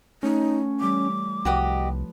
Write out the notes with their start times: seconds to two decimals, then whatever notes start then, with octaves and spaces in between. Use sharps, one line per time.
0.23 A3 C#4 D#4 C#5 F#5
0.80 E3 G3 D6
1.45 C2 F3 F#4 G4 B4 D#5 B5